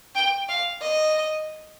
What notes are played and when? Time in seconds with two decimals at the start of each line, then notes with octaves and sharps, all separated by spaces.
0.15 G5
0.49 F5
0.81 D#5